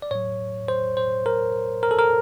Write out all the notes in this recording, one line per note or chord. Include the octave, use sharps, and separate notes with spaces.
D5
A2 F#3 C#5
C5
C5
A#4
A#4
A4
A#4